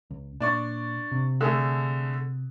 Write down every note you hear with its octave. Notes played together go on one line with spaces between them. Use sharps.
C#2
A#2 D4 D5 C#6
C3
D3 A3 G#4